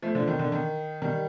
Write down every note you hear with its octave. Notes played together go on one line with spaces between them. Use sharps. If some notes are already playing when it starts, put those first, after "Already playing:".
F3 A3
D3 F3
D#3
D3
D#3
D#3 G3